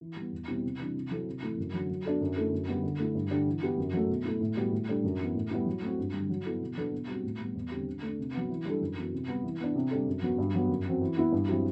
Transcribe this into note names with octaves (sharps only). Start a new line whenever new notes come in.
E3
G3 B3
E2
B2 G3 C4 E4
C3
E3 G3 D4
C3
F#3 C4 E4 A4
C3
E3 A3 E4
F#2
D3 F#3
F#3
B3 D4 F#4 A4
F#2
D3 A3 E4 A4
F#2
D3 G3 B3
D3
A3 E4
G2
D3 G3 D4
E3
B3 E4 G4
F#2
F#3 A3
B2
A3 E4
A2
G3 B3 F#4
A2
G3 D4 A4
F#2
E3 B3
A2
G3 B3 E4
F#3
A3 C4 F#4
G2
D3 G3
F#3
B3 E4 A4
B2
F#3 B3 D4 A4
B2
G3 C4 F#4
A2
G3 B3
E2
D3 G3 C4 G4
D3
A3 D4
C3
F#3 B3
E3
G3 D4 A4
F#2
E3 B3 F#4
C3
G3 B3
E3
B3 D4
C3
G3 D4 A4
F#2
F#3 B3 F#4
G2
F#3 B3
F#2
F#3 C4 F#4
E3
B3 E4
G2
F#3 C4 E4 G4